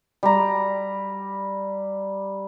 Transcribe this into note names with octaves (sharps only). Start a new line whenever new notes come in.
G3 A#5